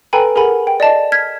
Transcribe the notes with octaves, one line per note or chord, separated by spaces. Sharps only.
A4 B4 G5 G#5 A#5 B5
G#4 A#4 F#5 G#5 B5
G5
D5 D#5 A5
F6 G#6 B6